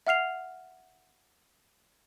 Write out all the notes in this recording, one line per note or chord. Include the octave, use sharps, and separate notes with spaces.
E5 F#5 F6 C7 F7